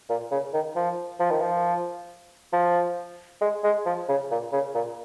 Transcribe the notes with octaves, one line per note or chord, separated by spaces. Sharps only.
A#2
C#3
D#3
F3
F3
D#3
F3
F3
G#3
G#3
F3
C#3
A#2
C#3
A#2